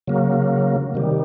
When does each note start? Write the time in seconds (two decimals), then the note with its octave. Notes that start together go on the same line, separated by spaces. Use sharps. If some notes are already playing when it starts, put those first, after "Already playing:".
0.07 C#3 F#3 A#3
0.94 C3 D#3 G3